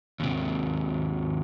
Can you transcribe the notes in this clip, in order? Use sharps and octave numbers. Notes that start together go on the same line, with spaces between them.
D#2 C3